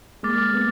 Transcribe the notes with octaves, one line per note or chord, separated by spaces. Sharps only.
G#3 A#3 D6 F6 A6
A3 B3